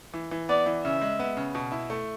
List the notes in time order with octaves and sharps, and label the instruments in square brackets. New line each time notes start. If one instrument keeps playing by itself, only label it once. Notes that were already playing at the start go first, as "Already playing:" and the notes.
[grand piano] E3
E3
[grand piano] B3 [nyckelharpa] D5
[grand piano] E3
[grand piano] C#3 [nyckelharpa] E5
[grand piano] G#3
B3
C#3
B2
E4
A3